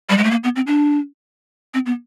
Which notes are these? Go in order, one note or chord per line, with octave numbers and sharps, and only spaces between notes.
G3
G#3
A3
A#3
B3
C4
D4
C4
B3